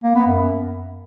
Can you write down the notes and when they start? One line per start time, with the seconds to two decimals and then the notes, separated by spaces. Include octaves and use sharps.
0.03 A#3
0.15 B3
0.27 F#2